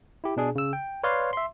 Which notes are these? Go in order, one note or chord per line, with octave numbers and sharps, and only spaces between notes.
E4 G4
B2 D4 G#4
C#3 E6
G5
B4 C#5 D5 F5 C6
E5 C6